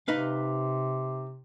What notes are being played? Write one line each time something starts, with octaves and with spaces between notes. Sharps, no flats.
C3 D#4 B4 F5